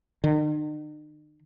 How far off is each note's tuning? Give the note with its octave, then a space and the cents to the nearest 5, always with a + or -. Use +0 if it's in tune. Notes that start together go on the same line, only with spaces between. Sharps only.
D#3 -45